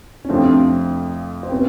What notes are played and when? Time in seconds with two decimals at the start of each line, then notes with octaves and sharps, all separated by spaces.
0.25 C#4
0.29 F2 C3 F3 A3 C4 D4
1.43 C4
1.52 C3 B3 C#4